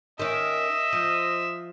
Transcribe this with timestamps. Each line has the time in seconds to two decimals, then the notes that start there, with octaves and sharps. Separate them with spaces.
0.19 D#3 C#4 D#5 E5
0.93 F3